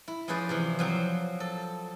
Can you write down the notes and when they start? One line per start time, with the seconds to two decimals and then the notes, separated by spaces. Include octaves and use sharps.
0.08 E4
0.28 F3 C#4 G#4 B4 C5 D5
0.49 C3 E3 F3
0.79 F3 F#3 C4
1.40 A4